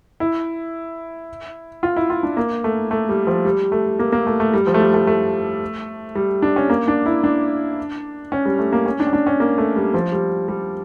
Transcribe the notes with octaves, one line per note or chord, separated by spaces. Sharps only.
E4
F4
E4
F4
D4
A#3
A3
A3
G3
F3
G3
A3
A#3
A#3
A3
A3
G3
F3
A3
G3
A3
A3
G3
D4
C#4
A#3
D4
E4
D4
C#4
G3
A3
A#3
C#4
D4
C#4
D4
C#4
A#3
A3
G3
F3
G3
G3